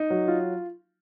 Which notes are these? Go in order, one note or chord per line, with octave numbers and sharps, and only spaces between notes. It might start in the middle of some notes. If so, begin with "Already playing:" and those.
Already playing: D#4
F#3
F4